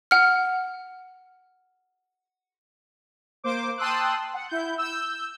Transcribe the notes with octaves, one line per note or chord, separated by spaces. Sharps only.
F#5 F6
A#3 C5 D6
G5 A5 C6 D#6 E6 F#6
F#5
E4 G6
E6 G6